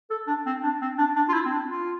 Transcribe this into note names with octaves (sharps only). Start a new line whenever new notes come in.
A4
D4
C4
D4
C4
D4
D4
F4
E4
C4
D4
F4